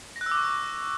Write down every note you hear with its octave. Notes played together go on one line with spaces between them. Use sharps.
A#6
F#6
E6
D6
C#6